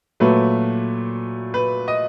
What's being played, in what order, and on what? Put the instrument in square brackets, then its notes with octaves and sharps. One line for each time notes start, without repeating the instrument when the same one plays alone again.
[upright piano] A#2 F#3 A3 B4
B4
D#5